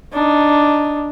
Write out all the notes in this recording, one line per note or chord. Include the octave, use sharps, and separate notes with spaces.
D4 D#4